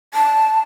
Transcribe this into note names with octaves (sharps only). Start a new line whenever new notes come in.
A5